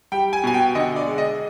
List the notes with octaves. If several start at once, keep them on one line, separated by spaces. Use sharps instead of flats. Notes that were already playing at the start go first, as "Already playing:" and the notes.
G3 G5
G#5
B2 G#5
G5
D3 D#5
D5
G#3
D#5